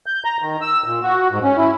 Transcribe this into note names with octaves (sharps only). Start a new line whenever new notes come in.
G6
A#5
D#3
E6
A#2
F#4
G#2
C#4
E4